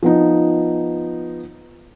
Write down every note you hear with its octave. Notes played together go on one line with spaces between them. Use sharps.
F3 B3 D#4